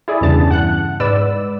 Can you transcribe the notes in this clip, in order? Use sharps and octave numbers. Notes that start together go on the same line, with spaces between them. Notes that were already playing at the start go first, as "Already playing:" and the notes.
E4 G#4 D5
E2 G2 C#3 A5
F#5 F#6
G#2 B4 D5 E6